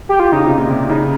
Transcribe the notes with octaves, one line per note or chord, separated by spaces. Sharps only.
G4
F4
C#3 D#4
C3
A#2
C3
C#3 D#4